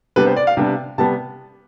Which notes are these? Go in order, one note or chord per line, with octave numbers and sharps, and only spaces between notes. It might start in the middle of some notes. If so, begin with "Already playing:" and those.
C3 G3 B3 D4 B4
C5
D5
F5
C3 G3 B3 D4
C3 G3 B3 A5